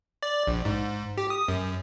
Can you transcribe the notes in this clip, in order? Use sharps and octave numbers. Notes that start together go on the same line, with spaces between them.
D5
A#1
G#2
G4
D#6
F#2